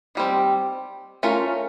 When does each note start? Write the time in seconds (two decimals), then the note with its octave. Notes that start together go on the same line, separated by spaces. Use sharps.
0.15 D#3 G3 C4
1.23 A3 C#4 F4 A#4